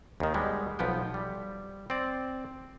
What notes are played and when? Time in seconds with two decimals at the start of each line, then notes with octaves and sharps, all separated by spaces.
0.20 D#2 D#3
0.34 G3 G#3 B3
0.79 B1 F3 B3 G5
1.14 G3
1.90 C4 D5